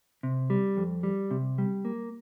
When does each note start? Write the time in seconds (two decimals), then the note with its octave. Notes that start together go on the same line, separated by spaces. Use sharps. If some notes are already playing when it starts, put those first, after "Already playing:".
0.23 C3
0.50 G3
0.77 F2
1.03 G3
1.31 C3
1.58 G3
1.85 A#3